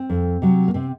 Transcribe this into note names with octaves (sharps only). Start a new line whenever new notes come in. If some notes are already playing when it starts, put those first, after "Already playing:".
Already playing: C4
F2
C3 F#3
A#3
C3 C4